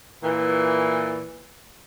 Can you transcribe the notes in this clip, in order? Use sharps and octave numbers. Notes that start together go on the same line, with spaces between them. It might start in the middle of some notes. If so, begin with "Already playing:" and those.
A#2 E3